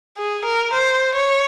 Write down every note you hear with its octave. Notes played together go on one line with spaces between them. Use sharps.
G#4
A#4
C5
C#5